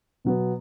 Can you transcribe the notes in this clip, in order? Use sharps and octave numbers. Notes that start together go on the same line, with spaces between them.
B2 F#3 B3